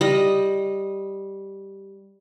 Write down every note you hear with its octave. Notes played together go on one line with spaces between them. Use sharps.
G3 D#5